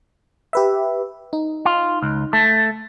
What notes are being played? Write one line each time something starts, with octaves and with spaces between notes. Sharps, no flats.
G4 B4 E5
D#4
F4
C#2
A3 A5